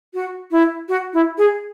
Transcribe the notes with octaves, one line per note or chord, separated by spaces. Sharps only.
F#4
E4
F#4
E4
G#4